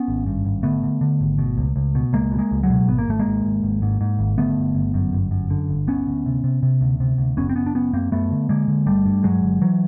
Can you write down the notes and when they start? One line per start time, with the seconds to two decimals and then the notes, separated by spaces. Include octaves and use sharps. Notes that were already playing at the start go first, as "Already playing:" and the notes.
Already playing: B3 C#4
0.08 G#1
0.26 G2
0.45 G#1
0.63 D3 A3 B3
0.83 D3
1.01 D3
1.21 G#1
1.38 B2
1.58 C#2
1.76 C#2
1.95 B2
2.13 C#2 G#3 A#3
2.32 B2
2.39 G#3 A#3
2.51 C#2
2.63 F#3 G#3
2.70 B2
2.88 G#1 B3
2.98 A#3
3.08 G#1 A3
3.19 G#3 A#3
3.26 G#1
3.45 G#1
3.63 G#1
3.82 G#2
4.01 G#2
4.19 G#1
4.38 D3 A3 B3
4.57 G1
4.75 G1
4.94 F#2
5.13 G1
5.31 F#2
5.50 D3
5.69 G1
5.87 D2 B3 C#4
6.07 D2
6.26 C3
6.44 C3
6.63 C3
6.81 D2
7.00 C3
7.18 D2
7.37 F#1 B3 C#4
7.49 C4
7.56 F#1 B3 C#4
7.66 D4
7.75 F#1 B3 C#4
7.93 F#2 A#3 C4
8.11 F#2 A3 B3
8.31 D3
8.49 D3 G#3 A#3
8.68 D3
8.87 G1 G3 A3
9.06 G2
9.24 G2 F#3 G#3
9.43 G1
9.62 E3 F#3